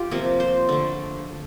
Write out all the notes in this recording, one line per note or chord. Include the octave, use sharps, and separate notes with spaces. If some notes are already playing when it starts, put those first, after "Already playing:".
Already playing: F4 G4
C3 F3 A#3
C5
D3 A3